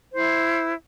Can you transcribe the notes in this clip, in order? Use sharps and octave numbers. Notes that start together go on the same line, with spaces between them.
E4 C5